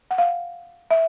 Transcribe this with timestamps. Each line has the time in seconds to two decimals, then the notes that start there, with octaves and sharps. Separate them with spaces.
0.11 F#5
0.18 F5
0.90 E5